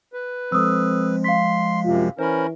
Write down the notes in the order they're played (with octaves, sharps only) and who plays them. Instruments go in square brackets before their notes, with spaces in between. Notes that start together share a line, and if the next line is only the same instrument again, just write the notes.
[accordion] B4
[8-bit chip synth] F3 G#3 [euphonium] C4 [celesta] A4 D#6 E6
[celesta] F5 B6 [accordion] C6
[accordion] F#2 C3 [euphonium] F4
[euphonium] E3 [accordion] C#4 A#4 [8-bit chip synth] C5 B5